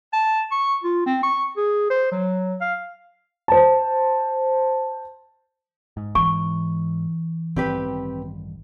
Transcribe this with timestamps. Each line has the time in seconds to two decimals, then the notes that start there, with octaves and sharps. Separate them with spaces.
0.13 A5
0.51 C#6
0.83 F4
1.06 C4
1.23 C#6
1.57 G#4
1.90 C5
2.11 F#3
2.61 F5
3.48 C5 A5
5.97 G#2
6.15 E3 C#6
7.56 A1 G2 D#3 C4 G4 B4